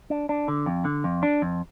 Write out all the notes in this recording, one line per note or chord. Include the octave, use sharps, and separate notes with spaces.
D4
D4
D3
F2
D3
F2
D4
F2